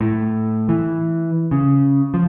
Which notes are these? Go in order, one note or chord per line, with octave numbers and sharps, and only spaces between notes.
A2
E3
C#3
F3